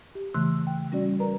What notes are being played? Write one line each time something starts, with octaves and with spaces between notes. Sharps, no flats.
G4
C#3 E3 A3 C6 E6 F#6
G5
G3 C#4 F#4 D5
A#4 B4 D5 A#5